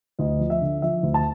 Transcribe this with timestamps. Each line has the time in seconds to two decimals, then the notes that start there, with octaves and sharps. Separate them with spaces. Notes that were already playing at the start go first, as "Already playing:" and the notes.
0.19 D2 D#5
0.40 F3
0.50 E5
0.61 D3
0.82 F3 E5
1.03 D2
1.14 A5